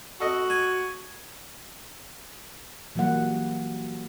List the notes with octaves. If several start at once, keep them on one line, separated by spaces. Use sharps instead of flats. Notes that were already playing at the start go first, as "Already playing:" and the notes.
F#4 A4 D#5
G#5
E3 F#3 G3 A#3 F#5